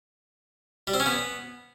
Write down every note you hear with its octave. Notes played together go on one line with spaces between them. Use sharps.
G3
C4
C#4
B3